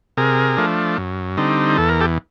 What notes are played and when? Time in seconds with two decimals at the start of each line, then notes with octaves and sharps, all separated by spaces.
0.17 C3 G#4 A#4
0.57 F3 A3 D4
0.98 F#2
1.37 D3 G3 C4 D#4
1.78 E2 A4
1.89 A#4
2.01 G4 A4